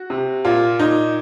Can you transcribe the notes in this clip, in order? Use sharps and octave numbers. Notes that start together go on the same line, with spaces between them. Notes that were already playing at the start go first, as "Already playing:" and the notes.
Already playing: F#4
C3
A#2 F4
A#2 D#4